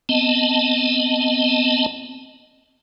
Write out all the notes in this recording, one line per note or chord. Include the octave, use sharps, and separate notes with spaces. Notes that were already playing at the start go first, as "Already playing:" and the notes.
B3 C4 D#5 A5